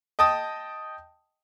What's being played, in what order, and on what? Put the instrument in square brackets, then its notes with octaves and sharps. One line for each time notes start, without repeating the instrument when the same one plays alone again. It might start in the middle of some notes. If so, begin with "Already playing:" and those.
[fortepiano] D#5 G5 A5 D#6